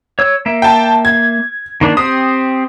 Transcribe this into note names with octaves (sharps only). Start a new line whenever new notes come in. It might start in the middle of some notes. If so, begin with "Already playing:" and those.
C#5 E6
A#3 E5
G5 A5
G#6
D#3 A#3 D4
C4 G4 C5 D#6